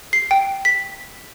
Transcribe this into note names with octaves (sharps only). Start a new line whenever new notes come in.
C7
G5
B6